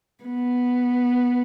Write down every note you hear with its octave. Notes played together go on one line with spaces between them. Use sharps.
B3